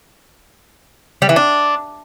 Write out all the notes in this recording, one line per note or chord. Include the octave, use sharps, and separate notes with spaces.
G3
E3
D4